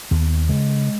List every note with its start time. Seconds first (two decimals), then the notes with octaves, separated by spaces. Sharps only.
0.11 D#2 B3
0.49 C#3 G#3